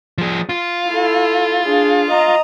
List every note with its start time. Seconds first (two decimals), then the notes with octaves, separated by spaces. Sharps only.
0.18 F3 G#4
0.49 F4
0.87 E4 A4
1.63 D4 G#4
2.11 D#5 A#5